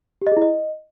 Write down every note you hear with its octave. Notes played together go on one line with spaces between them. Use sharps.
G4
D#5
G#4
E4
D#5